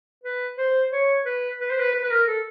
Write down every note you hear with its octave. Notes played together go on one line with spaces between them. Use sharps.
B4
C5
C#5
B4
B4
C5
B4
B4
B4
A#4
A4